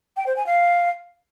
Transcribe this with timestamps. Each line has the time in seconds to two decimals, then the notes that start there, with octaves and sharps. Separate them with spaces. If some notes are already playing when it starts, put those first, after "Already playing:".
0.16 G5
0.26 C5
0.36 G#5
0.46 F5